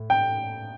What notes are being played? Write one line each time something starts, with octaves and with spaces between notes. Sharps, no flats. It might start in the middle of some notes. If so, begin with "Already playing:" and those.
Already playing: A2
G5